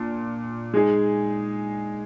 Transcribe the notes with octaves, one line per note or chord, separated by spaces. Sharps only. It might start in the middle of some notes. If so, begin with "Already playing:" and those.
Already playing: A#2 D4
G#3 D#4 G#4